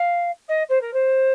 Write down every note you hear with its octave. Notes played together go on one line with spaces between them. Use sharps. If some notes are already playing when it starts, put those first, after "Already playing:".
Already playing: F5
D#5
C5
A#4
C5